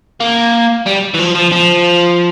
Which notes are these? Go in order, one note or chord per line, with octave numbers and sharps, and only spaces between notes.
A#3
G3
E3
F3
F3
F3